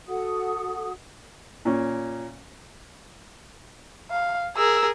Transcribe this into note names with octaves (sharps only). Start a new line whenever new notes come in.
F#4 A4 F#5 D#6
A#2 C#4
F5
G#4 A#4 E6